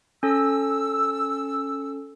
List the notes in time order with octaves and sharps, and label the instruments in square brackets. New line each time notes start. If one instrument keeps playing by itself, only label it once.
[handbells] C#4 A4 [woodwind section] E6